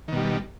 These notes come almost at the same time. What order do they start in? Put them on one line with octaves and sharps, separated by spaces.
D#3 B2 G3